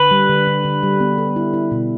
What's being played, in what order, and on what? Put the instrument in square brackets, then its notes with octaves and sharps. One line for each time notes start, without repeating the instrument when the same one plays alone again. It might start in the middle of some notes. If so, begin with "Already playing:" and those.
Already playing: [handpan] D3 [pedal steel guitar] B4
[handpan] G3
D3
D3
D3
G3
B3
A4
E4
E4
B2